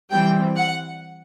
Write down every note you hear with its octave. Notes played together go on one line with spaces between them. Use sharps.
E3 G3 C4 G5
F#5